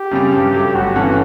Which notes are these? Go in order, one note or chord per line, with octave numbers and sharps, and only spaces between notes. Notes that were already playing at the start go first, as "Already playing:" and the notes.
Already playing: G4
F#2 C#3 G3
G2
F#3 A3
G1 F#4
G2 E3 A3 C#4